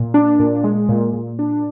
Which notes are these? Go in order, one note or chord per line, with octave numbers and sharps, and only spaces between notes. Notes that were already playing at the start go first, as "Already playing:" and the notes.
Already playing: A#2
D4
A#2
G#3
A#2
A#2
D4